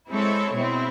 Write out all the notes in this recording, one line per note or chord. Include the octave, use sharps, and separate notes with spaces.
G#3 C4 E4 A4 C#5
B2 G#3 C4 E4